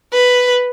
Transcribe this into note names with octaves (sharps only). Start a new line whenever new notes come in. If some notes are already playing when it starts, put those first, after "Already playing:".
B4